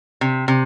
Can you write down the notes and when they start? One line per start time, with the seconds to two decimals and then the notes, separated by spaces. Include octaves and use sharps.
0.21 C3
0.48 C3